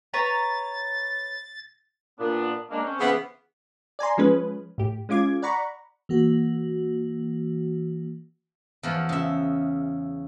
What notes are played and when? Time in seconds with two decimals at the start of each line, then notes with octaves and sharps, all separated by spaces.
0.14 B4 C#5 A#5 A6
2.19 A#2 B3 D4
2.71 G#3 A#3 D4
2.83 C4 C#4
3.00 C#3 E3 B3
3.99 D5 G#5 A#5 C6
4.17 F3 G#3 C#4 B4
4.78 A2 G4
5.09 G#3 C#4 F4 D6 G#6
5.42 D5 F#5 A#5 B5 C#6
6.09 E3 A#3 F#4
8.83 E2 F3 C#5
9.09 C#3 E5